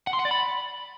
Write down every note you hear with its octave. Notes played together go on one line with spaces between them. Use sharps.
F#5
C6
F#5
D5
B5